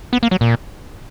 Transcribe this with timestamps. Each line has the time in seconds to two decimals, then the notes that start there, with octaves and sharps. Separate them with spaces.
0.13 B3
0.23 A#3
0.31 F#3
0.41 A#2